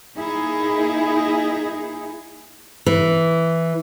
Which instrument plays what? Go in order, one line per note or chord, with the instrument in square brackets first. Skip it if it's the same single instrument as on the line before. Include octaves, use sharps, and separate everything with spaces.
[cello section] A#3 D#4 E4 G#4
[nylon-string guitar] E3